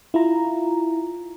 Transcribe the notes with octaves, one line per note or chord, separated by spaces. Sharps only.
E4 F4 A#5